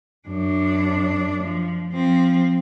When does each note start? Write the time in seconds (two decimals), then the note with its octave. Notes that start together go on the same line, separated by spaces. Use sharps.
0.28 F#2 D4
1.44 F3
1.91 F3 C4